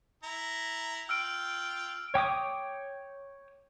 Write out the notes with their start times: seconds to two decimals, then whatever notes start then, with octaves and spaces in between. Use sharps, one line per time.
0.23 E4 A#5
1.09 F4 G5 E6 F6 D7
2.14 C#5 G5 D6 D#6